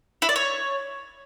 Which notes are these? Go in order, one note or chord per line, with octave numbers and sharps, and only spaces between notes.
E4
D5
C#5